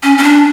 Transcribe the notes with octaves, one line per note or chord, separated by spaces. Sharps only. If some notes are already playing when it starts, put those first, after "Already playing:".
C#4
C#4
D4